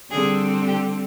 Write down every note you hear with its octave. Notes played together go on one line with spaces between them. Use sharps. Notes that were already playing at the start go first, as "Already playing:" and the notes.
D3 G3 C4 G#4
G4